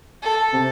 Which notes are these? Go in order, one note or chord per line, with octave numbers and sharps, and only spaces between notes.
A4
C3